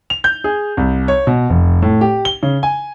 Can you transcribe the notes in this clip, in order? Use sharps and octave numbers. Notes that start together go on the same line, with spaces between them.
F7
G6
G#4
C2
C#5
B2
F1
A2
G4
G7
C#3
G#5